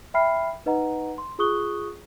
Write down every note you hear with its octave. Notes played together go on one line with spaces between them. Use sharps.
E5 G5 B5 F6 C7
D#4 B4 D#5 F#5 A#5
C6
F4 G#4 C#6 D#6 F#6 G7